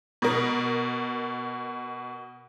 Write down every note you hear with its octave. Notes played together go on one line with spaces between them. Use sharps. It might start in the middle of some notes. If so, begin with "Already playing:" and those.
B2 A#4